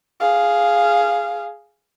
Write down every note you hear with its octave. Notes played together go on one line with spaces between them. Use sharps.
G#4 F5